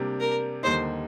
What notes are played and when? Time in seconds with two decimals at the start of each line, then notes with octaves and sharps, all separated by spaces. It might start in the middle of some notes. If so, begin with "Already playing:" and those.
Already playing: C3 G3 A#3 D4 G4
0.20 A#4
0.63 D#2 D3 G3 A#3 D#4 C5